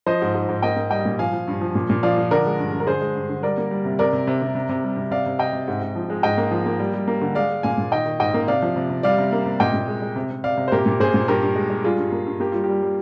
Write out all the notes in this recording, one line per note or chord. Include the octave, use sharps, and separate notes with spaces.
F3 C5 D#5
G#2
G#2
G#2
A#3 D#5 G5
A#3
G3 D#5 G5
A#2
F3 F5 G#5
F3
G2
F3
A#2
A#2
F3 D5 F5
F3
D3 A#4 D5
G#3
G2
D3
A#4
D3 G#4 C5
G#3
G2
D3
G3 A#4 D5
A#3
G3
C3
C3 A#4 D5
C3
C3
C3
C3
C3
G3
C3
C3 D5 F5
C3
C3 D#5 G5
C3
G#2
G#2
F3
G#3
G#2 D#5 G5
A#3
F3
A#3
G3
G3
A#3
D3
G#3 D5 F5
G#3
A#2 F5 G#5
A#2
D#3 D#5 G5
D#3
G#2 D#5 G5
A#3
C3 D5 F5
F3
C3
C3
G3 D5 F5
C3
A#3
C3
A#2 D#5 G5
A#2
G#3
G#3
C3
C3
C3 D5 F5
C3
C5
A#2 G4 A#4
A#2
A#2 G#4 C5
A#2
G2 G4 A#4
G2
G#3
G#3
G3 F4 G#4
G2
A#3
G2
A#3 G4
G3 F4
G4
G3
G3